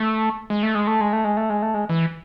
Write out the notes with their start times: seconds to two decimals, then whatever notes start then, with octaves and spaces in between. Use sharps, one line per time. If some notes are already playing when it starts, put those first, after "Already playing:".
Already playing: A3
0.50 G#3
0.63 A3
0.75 G#3
0.87 A3
1.00 G#3
1.13 A3
1.24 G#3
1.37 A3
1.50 G#3
1.62 A3
1.74 G#3
1.89 E3